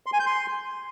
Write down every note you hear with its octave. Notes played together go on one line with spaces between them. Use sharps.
C6
G#5
G6
C6